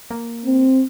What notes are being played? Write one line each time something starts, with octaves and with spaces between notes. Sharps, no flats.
A#3
C4